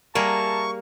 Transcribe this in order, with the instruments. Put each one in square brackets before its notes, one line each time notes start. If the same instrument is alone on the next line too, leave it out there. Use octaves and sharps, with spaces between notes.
[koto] G3 G#4 A#4 [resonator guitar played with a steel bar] A#3 [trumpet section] E5 A5 A#5 [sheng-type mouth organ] C#6